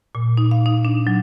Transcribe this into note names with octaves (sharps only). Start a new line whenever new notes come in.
A#2
D#4
F5
D#4
D4
F#3